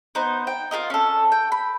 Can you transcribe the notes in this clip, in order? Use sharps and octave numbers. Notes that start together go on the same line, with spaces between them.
B3 D#4 C5
G5
F4 G#4 A#4 D#5
C#4 A4
G5
B5